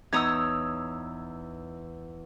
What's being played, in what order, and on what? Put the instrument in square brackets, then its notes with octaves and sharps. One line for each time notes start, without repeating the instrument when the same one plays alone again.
[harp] E2 [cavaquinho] D#4 C#5 D#6 [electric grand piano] E6 G#6